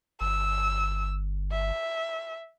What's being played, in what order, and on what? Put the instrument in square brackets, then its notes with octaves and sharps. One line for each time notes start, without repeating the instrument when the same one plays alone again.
[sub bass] G1 [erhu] E6
[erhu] E5